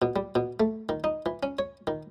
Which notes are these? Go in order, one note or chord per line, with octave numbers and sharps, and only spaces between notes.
B2
G3
B2
A3
D#3
D#4
E3
C#4
C#5
D#3